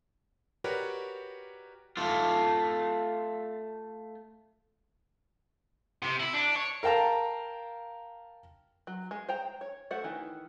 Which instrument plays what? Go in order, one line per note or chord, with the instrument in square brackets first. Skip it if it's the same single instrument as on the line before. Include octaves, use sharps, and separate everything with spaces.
[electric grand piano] F#4 G4 A#4 B4 C#5 D5
[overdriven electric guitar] A3 F4
[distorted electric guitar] C3
E4
D4
C#5
[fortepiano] A#4 F5 G5 A5 A#5
[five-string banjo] F#3
G#3
C5 G5 A#5
C#5
A3 F#4 C5 F#5
D#3 E3